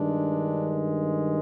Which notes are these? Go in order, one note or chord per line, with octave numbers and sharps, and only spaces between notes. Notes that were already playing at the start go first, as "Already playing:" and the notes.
Already playing: G2 D#3 G#3 D4